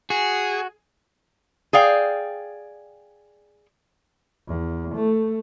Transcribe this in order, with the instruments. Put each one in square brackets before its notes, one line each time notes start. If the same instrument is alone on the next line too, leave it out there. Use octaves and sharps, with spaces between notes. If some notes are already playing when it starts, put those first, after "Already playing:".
[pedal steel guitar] F#4 [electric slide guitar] G#4
[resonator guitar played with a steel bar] G#4 D5 F5 G5
[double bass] E2
A3